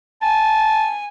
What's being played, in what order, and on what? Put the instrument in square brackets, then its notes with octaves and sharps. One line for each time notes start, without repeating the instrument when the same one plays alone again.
[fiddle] G#5 [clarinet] A5